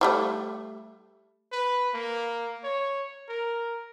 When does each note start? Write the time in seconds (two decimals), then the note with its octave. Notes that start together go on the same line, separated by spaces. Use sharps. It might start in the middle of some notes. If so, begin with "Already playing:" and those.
0.01 F3 G3 A3
1.52 B4
1.94 A#3
2.64 C#5
3.29 A#4